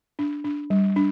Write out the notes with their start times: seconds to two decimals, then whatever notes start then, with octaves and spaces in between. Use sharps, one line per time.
0.19 D4
0.44 D4
0.70 G3
0.96 D4